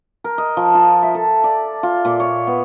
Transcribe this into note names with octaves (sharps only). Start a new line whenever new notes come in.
A#4
D#5
F3
F4
E5
A4
D5
F4
A#2
C#5
B3